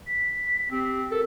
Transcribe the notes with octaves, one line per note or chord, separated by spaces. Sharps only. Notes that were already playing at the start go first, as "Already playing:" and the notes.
B6
C4 G4
A4 A#4